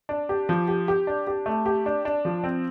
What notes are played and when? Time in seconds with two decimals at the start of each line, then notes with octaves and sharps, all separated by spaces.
0.09 D4
0.29 G4
0.49 F3
0.68 G4
0.88 G4
1.07 D4
1.27 G4
1.46 A3
1.66 G4
1.86 D4
2.05 D4
2.25 F3
2.44 C4